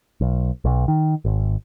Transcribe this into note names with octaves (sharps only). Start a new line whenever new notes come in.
B1
B1
D#3
G#1